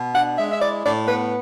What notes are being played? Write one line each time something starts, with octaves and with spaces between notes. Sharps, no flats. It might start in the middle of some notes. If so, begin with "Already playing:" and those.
Already playing: B2
D4 F#5
G#3 E5
E5
E4 D5
A2 D5
B3 B4